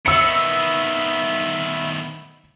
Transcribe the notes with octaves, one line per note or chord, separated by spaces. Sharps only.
D#3 B3 E5 B5 E6 C#7